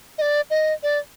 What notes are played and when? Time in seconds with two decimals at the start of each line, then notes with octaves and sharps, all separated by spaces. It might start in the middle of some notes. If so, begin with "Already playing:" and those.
0.18 D#5
0.22 D5
0.50 D#5
0.83 D5